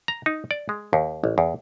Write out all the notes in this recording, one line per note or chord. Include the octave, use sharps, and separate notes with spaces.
A#5
D#4
D5
G#3
D#2
A1
E2